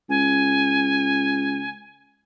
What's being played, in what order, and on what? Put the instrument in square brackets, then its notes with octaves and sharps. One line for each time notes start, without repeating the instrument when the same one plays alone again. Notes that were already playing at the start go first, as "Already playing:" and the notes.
[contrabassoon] C#2 [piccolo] G#5